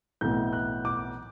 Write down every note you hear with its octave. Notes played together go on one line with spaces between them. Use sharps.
B1 A2 E3 B3 G6
F#6
D6